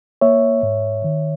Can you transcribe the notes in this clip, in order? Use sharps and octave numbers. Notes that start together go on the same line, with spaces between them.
A#3 C#5 E5
G#2
D#3